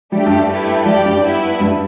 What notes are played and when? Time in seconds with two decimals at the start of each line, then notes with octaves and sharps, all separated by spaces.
0.12 G3 A3 D4 G4
0.26 G2 G3
0.49 A3 E4 G4 B4
0.86 G3 G4 D5 G5
1.05 G2 G3
1.23 B3 E4 B4
1.60 G2 G3